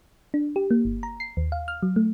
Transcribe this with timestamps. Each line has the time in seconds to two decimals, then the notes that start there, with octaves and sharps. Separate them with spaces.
0.34 D4
0.56 G4
0.71 A#3
0.85 G1
1.03 A#5
1.20 C7
1.37 D#2
1.52 F5
1.68 F6
1.83 F#3
1.96 A3